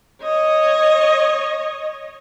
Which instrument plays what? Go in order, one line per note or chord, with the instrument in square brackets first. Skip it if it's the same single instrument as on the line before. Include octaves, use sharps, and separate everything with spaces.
[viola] C#5 D#5